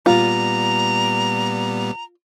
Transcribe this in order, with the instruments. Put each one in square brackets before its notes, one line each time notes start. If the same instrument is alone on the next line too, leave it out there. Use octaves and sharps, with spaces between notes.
[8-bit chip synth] A#2 G3 B3 [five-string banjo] F4 [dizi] A#5